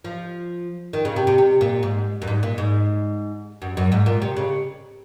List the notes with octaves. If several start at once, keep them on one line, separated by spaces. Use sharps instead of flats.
F3
D#3
C#3
C3
C3
C3
A#2
G#2
F#2
G#2
A#2
G#2
F#2
F#2
G#2
A#2
C3
C#3